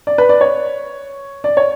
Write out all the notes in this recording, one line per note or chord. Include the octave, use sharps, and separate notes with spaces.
D5
B4
D5
C#5
D5
C#5